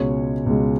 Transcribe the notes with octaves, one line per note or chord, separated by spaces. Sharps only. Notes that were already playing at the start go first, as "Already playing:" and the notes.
Already playing: C#2 B2 G#3 C#5
C#2 B2 G#3